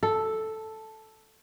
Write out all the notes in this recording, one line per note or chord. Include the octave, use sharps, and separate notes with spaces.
A4